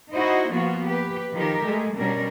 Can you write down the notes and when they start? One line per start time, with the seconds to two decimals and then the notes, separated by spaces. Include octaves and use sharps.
0.12 D#4 E4 F#4 C5 D#5
0.51 F3 A#3 B3 F4 F#4
0.86 G4 B4
1.33 D#3 F3 G4 A#4
1.62 G#3 A3
1.96 B2 G3 C#4 D4 A#4